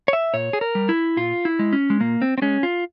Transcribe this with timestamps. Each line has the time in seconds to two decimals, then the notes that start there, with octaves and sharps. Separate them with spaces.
0.08 C#5
0.13 E5
0.34 A#2 C#5
0.53 G#4
0.61 A#4
0.75 G3
0.89 E4
1.17 A#2 F4
1.45 E4
1.59 G#3
1.73 C#4
1.90 G#3
2.00 A#2 A#3
2.22 C4
2.38 C4
2.42 G#3 C#4
2.63 F4